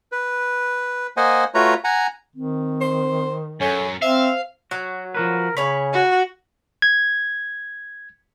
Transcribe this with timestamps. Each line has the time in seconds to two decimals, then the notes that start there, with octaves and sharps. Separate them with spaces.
0.12 B4
1.17 A#3 C5 D#5 F#5 G#5
1.54 A3 F4 F#4 B4 C#5 A#5
1.84 F#5 G#5 A#5
2.36 D#3 C4
2.81 C5
3.61 F#2 C#4 A4
4.02 C4 C5 E5 F5
4.71 F#3 F#4
5.15 F3 F#4 A#4 B4
5.57 C#3 C#4 C#5 G#5 B5
5.93 F#4
6.82 G#6